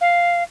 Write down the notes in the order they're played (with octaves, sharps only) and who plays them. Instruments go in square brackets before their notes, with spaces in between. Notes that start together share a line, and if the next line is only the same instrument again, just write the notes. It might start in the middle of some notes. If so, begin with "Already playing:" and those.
[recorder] F5